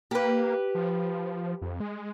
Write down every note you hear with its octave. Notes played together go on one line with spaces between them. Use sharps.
A#3 G4 B4
F3
F2
G#3